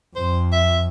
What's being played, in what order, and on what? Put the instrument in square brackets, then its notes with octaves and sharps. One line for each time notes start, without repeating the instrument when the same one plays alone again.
[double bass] F2 [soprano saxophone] C5
[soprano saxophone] E5